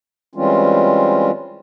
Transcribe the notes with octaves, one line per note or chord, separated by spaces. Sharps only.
E3 G3 G#3 C4 C#4 F4